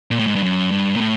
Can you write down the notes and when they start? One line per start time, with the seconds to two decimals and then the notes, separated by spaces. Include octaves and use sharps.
0.11 A#2
0.19 A2
0.27 G#2
0.35 G2
0.43 F#2
0.71 G2
0.96 A#2
1.00 A2